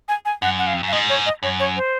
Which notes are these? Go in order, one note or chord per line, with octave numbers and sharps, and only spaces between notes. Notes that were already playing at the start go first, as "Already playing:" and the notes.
G#5
G#5
F#2 F#5
F#5
F5
F2
F#2
F5
G#2 D#5
C#5
D#5
F#2 C#5
C#5
C5